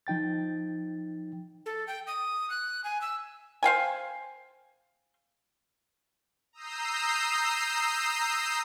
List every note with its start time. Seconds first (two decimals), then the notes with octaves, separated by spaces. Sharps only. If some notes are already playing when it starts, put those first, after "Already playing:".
0.07 F3 D#4 G5 A6
1.66 A4
1.87 G5
2.07 D#6
2.50 F#6
2.84 G#5
3.01 E6
3.63 C5 F5 G5 G#5
6.53 A#5 D#6 E6 G6 C7